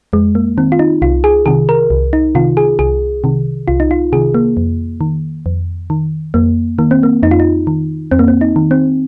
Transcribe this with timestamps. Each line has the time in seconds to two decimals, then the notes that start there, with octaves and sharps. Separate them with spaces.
0.13 F2 G#3
0.35 A#3
0.58 D#3 C4
0.72 F4
0.79 D#4
1.02 C2 F4
1.24 G#4
1.46 C3 D#3 G#4
1.69 A#4
1.90 C2
2.13 D#4
2.35 C3 D#3 F4
2.57 G#4
2.79 C2 G#4
3.24 C3 D#3
3.68 C2 F4
3.80 D#4
3.91 F4
4.13 C3 D#3 G#4
4.34 A#3
4.57 F2
5.01 D#3
5.46 F2
5.90 D#3
6.34 F2 A#3
6.79 D#3 A#3
6.91 C4
7.03 A#3
7.23 F2 D#4
7.31 F4
7.40 D#4
7.67 D#3
8.11 F2 C4
8.19 A#3
8.28 C4
8.41 D#4
8.56 D#3
8.71 C4